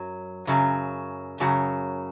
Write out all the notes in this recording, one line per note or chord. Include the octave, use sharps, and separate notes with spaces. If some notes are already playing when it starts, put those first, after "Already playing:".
Already playing: F#2 F#3
F#2 C#3 F#3
F#2 C#3 F#3